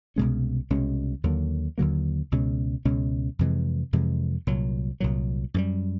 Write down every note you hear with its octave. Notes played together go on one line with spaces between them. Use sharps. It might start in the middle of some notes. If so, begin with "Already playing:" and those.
C2 B2 G#3 C#4
C2 B2 G#3 C#4
D#2 D3 F#3 A#3
D#2 D3 F#3 A#3
C#2 B2 G#3 C#4
C#2 B2 G#3 C#4
F2 C3 E3 G#3
F2 C3 E3 G#3
C2 A#2 F#3
C2 A#2 F#3
F#2 D#3 G3